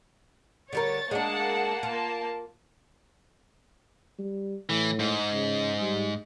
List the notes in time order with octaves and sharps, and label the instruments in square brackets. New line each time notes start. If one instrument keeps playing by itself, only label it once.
[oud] D3 G3 A#4 [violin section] C#5 A6
[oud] G#3 D4 [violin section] A#3 F#5 A5
[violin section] A#3 A5 [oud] F4
[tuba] G3
[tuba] A2 [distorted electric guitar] E3
[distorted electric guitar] G#2
[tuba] C#3
G3